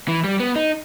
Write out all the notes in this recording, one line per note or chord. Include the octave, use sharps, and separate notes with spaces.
E3
G3
B3
D#4